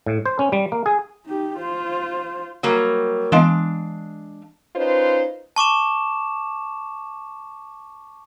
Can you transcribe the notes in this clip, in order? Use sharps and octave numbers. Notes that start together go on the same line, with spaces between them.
A2
C5
C#4
G3
A#3
G#4
D#4 G4
F4 C5
F#3 G3 A#3
E3 G#3 B3 D4 F5
C#4 D#4 F4 B4 C5
A5 C#6 D6 E7